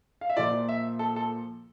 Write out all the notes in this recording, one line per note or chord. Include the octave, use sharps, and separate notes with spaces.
F5
E5
A#2 F3 D5
E5
A4
A4